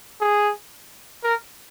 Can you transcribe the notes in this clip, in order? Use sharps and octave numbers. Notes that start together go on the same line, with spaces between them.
G#4
A#4